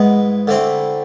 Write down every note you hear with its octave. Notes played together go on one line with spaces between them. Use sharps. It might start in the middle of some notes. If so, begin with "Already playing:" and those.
Already playing: G#2 G#3 B3 E4
D3 A3 C4 E4